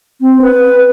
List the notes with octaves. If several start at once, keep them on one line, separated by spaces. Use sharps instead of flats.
C4
B4